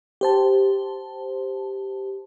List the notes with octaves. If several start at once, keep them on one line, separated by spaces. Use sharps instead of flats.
G4 C5 A5